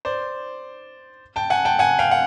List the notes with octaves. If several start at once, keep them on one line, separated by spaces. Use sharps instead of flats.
C5 D5
G5 A5
F#5 G#5
G5 A5
F#5 G#5
F5 G5
F#5